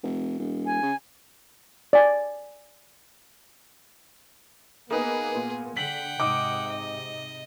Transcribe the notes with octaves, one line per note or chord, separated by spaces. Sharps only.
F1
E1
G#5
C#3
D5 G#5
A#3 B3 D#4 G#4 B4
A#2
D3 F#5 G5 B6 F#7
G#2 C3 D#4 D6
D#5